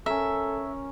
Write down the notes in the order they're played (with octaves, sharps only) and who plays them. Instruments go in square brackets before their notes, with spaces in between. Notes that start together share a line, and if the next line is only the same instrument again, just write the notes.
[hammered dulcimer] C#4 A#4 [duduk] A4 [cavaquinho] E5